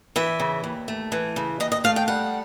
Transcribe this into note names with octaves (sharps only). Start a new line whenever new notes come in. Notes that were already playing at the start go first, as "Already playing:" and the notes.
E3 E5
C#3
D#2
A3
E3
C#3
D#2 D#5
D#5
A3 F5
G5
G3 F#5